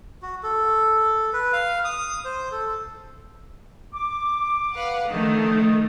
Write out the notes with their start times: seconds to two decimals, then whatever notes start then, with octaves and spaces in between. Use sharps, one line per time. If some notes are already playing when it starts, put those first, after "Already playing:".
0.22 F#4
0.43 A4
1.33 B4
1.53 F5
1.85 D#6
2.25 C5
2.52 A4
3.94 D6
4.74 B4 F5 F#5
5.09 D3 D#3 F3 A3 C#4 D#4